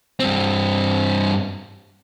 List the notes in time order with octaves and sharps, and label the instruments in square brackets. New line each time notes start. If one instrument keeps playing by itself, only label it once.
[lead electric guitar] G2 C4